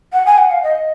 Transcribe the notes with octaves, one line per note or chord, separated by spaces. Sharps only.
F#5
G#5
F#5
F5
D#5